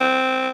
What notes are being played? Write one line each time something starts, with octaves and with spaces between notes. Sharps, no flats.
C4